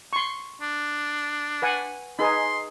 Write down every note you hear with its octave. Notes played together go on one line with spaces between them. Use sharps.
C6 C#6
D4
B4 F#5 G#5
D#4 G#4 B4 C6